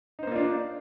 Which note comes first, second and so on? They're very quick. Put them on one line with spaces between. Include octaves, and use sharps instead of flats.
D#4 C5 A#3 F4 D4